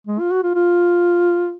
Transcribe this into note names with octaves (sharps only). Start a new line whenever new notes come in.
G#3
F4
F#4
F4
F4